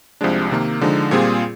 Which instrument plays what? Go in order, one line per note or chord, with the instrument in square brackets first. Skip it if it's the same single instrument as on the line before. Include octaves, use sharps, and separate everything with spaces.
[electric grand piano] C2 C3 F3 G#3 D4
C3 D#3 A#3
D3 F3 G#3 D#4
A#2 G3 C4 F4 G#4